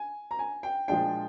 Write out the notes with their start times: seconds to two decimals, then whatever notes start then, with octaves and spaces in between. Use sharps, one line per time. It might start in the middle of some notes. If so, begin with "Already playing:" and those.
Already playing: G#5
0.31 A#5
0.39 G#5
0.63 G5
0.88 A#2 F3 G#3 D4 G5